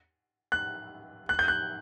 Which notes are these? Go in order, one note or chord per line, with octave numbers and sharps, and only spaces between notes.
F#6
F#6
G6
F#6